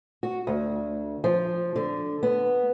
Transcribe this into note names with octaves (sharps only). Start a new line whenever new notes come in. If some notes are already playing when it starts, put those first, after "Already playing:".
F#4
D2
F3
D3
B3